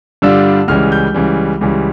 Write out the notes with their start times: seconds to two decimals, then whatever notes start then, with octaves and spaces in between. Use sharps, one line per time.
0.22 G2 D3 G3 D4 F4 E6
0.68 C#2 C#3 E3 G3 F6
0.92 G6
1.14 C#2 C#3 E3 G3
1.61 C#2 C#3 E3 G3